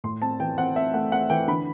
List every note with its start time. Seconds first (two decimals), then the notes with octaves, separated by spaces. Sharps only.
0.04 A2 C6
0.22 C4 A5
0.40 E3 G5
0.58 C4 F#5
0.76 C4 E5
0.94 A3 F#5
1.12 C4 F#5
1.30 E3 G5
1.48 D3 B5